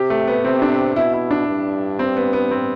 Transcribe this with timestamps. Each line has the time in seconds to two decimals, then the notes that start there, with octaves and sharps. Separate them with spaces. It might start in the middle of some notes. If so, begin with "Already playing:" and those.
Already playing: C3 G4
0.10 A3
0.27 B3
0.44 C3 C4
0.62 D4
0.96 B2 E4
1.13 E4
1.31 D4
1.48 G2
1.99 C4
2.17 B3
2.33 B3
2.51 C4